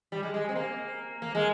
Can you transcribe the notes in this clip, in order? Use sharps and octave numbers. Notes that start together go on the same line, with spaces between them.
G3
G#3
G#3
C4
A#3
A#3
G#3